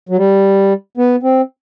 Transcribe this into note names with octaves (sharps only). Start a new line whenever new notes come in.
F#3
G3
B3
C4